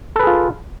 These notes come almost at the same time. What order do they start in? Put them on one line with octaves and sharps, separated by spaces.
A4 B4 G#4 F4